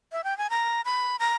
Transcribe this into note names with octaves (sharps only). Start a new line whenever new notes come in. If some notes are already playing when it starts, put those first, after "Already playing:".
E5
G5
G#5
A#5
B5
A#5